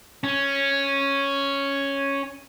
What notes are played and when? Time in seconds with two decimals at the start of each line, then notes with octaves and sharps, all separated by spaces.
0.24 C#4